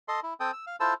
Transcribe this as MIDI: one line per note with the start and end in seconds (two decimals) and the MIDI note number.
0.08 0.20 69
0.08 0.20 75
0.08 0.20 84
0.23 0.34 64
0.40 0.51 60
0.40 0.51 69
0.40 0.51 79
0.40 0.51 87
0.53 0.65 88
0.67 0.76 77
0.80 0.94 64
0.80 0.94 65
0.80 0.94 69
0.80 0.94 72
0.80 0.94 81
0.80 0.94 88